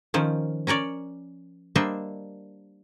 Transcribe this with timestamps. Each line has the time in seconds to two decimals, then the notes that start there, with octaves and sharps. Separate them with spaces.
0.14 D#3 F3 C#4
0.67 C#4 A#4 C#5 D5
1.75 G3 A#3 D4 C5 D#5 E5